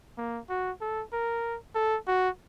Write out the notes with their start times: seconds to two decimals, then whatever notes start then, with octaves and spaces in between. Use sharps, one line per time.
0.18 A#3
0.49 F#4
0.81 A4
1.13 A#4
1.75 A4
2.07 F#4